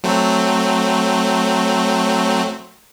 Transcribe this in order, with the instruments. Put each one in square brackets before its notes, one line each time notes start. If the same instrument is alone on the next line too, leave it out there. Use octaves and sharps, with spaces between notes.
[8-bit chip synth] F#3 A3 C4